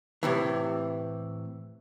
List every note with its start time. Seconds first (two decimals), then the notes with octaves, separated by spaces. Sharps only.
0.23 A2 C3 E3